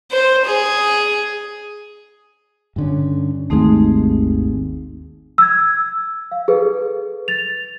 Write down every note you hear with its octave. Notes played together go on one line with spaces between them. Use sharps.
C5
G#4
G2 D3 C#4
G#1 D#2 G#3 A3 C4 D#4
E6 G#6
F5
G#4 A4 B4
A6 F7